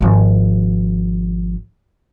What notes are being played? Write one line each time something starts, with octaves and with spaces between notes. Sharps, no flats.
G#1 F3